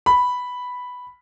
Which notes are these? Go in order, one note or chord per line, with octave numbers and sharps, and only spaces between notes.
B5